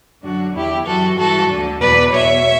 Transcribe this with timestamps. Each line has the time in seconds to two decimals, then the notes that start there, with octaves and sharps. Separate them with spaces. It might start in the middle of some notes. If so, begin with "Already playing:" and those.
0.23 F#2 D3 D4 F#4
0.55 E2 D3 E4 G4
0.86 F#2 E3 F#4 A4
1.18 G2 E3 F#4 A4
1.50 D2 D3
1.81 E2 B2 B4 D5
2.13 E2 B2 C#5 E5